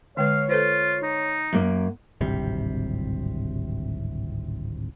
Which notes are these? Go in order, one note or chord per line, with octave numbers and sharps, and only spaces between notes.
D3 G#3 B4 C#5 F5
F4 A4 B4 C5
D#4
F#2 A#3
D1 G#1 C3 G3